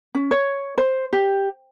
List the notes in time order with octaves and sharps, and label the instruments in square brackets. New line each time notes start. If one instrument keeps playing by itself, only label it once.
[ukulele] C#4
C#5
C5
G4